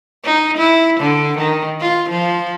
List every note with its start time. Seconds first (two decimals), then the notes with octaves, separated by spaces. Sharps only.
0.24 D#4
0.57 E4
1.00 D3
1.38 D#3
1.81 F4
2.09 F3